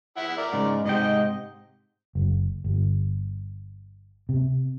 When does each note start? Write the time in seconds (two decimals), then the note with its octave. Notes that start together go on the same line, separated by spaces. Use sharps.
0.17 E4 E5 F#5
0.38 A#4 D5
0.53 G#2 C#3
0.85 G#2 C3 D#5 G5
2.15 F#1
2.64 G1
4.29 C3